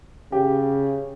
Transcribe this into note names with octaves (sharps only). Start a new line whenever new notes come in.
C#3 G4